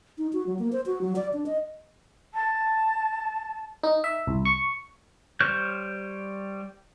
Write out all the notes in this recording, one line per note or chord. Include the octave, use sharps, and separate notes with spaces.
D#4
F#4
F#3
A#3
C5
F#4
F#3
D5
D4
D#5
A5
D#4
E5
C2
C#6
G3 C5 C#5 F6 G6